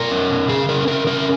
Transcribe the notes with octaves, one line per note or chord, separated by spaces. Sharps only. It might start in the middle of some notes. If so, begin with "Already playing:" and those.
Already playing: B2 A#4
C#4
B2
C#3 G#4
C#4 A#4
C#3 A#4
C#4 A#4